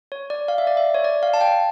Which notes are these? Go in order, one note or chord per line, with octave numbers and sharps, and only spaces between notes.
C#5
D5
F5
E5
D5
E5
C#5
D5
F5
A5
G5